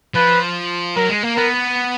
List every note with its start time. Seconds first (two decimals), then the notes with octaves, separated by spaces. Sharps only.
0.15 F3 B4
0.97 F#3 A#4
1.09 G#3
1.23 A#3
1.36 B3 A#4